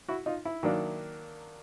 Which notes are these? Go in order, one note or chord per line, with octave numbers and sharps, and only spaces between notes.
E4 F#4
D#4 F4
E4
D#3 F#3 A#3 D4